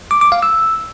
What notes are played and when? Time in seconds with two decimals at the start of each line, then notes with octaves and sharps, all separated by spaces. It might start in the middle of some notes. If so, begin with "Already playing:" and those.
0.11 D6
0.21 D6
0.32 F5
0.43 E6